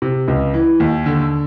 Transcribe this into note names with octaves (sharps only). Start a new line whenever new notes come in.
C3
C#2
E3
D#2
D3